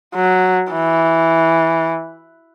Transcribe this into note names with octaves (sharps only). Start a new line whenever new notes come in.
F#3
E3